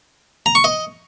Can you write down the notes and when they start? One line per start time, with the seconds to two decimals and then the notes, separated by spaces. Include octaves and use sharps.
0.46 A#5
0.55 C#6
0.64 D#5